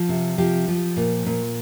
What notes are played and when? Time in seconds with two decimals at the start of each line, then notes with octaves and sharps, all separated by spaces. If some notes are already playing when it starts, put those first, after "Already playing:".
Already playing: F3
0.09 C3
0.38 F3 G4
0.68 F3
0.97 A#2
1.26 A#2